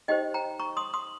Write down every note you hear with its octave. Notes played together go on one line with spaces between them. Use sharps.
D#4 G4 C5 D#5 G5
G5 A#5
A#5 C#6
C6 D#6
C6 D#6